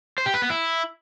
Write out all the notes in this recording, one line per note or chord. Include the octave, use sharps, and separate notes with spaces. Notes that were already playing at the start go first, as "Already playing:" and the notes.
C5
G4
B4
B3
E4